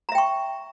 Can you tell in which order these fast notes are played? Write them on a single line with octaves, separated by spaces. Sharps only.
A#5 E5 G5 C#6